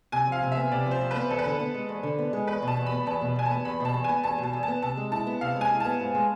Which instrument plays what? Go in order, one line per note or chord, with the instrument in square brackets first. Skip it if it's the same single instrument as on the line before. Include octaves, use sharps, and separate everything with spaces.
[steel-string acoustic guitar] C3 [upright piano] G#5
[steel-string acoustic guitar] F3 [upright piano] F5
[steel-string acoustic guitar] C3
[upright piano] E5
[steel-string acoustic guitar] B3
[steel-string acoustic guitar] C3 [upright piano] D5
[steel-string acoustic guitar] F3
[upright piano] C5
[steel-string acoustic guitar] C3
[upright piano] B4
[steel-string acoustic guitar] B3
[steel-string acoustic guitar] E2 [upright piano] A4
[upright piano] B4
[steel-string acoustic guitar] D3 [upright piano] A4
[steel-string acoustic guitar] B3
G#3
E2
D3
B3
G#3
[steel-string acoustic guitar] E2 [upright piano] B4
[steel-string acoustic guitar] B2
[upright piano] A5
[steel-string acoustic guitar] E2
[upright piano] B5
[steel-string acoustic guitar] B3
[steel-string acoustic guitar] E2 [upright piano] A5
[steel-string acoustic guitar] B2
[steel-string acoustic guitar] E2 [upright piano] G#5
[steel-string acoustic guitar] B3 [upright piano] A5
[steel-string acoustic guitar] E2 [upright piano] B5
[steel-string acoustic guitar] B2 [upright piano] A5
[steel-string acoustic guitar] E2
[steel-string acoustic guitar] B3 [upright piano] G#5
[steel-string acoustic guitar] E2 [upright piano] A5
[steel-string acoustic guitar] B2
[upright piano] A5
[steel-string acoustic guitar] E2
[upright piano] A5
[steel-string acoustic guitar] B3
[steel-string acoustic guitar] C3 [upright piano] A5
[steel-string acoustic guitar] G#3
[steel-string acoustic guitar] E4 [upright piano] A5
[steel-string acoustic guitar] B3
[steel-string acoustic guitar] C3 [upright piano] F5
[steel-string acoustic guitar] G#3
[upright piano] G#5
[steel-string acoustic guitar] E4
[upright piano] A5
[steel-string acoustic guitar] B3
G#2
G#3